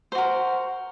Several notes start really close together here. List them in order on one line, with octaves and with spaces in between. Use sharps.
C5 F#4 A#4